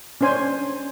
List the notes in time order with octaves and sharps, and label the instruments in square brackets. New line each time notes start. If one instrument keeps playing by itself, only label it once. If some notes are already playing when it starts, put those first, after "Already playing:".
[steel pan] C#4 D4 C5 G#5